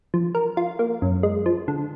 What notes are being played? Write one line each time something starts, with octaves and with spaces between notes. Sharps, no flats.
F3
A#4
F4
A#3
F#2
G#3
F3
D3